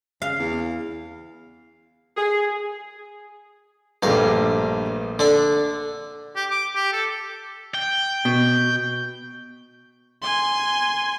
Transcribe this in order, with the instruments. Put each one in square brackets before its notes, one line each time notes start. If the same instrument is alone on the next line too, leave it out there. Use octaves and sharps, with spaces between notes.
[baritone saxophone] C#3 [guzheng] F5
[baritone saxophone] E2
[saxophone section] G#4
[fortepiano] A#1 A3 A#3 [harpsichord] G2 F5
[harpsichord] D3 D4
[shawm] G4
D6
G4
A4
[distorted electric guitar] G5
[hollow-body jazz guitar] B2
[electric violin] G#5 C6